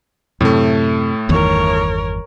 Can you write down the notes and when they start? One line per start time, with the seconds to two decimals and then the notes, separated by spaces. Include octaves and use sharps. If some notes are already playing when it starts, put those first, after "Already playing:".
0.41 F#2 A2 C3 A3
1.29 G1 E2 D#3 A#4 C#5